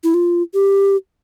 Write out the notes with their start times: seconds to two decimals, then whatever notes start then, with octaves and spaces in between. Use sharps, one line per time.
0.04 E4
0.14 F4
0.54 G4